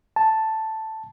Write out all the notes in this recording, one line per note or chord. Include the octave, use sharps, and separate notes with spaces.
A5